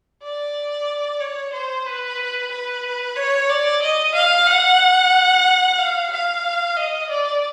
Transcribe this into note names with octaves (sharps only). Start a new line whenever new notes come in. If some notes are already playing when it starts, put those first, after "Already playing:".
D5
C#5
C5
B4
B4
C#5
D5
D#5
F5
F#5
F5
F5
D#5
D5